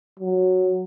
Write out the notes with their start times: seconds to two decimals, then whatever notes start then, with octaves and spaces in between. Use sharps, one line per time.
0.20 F#3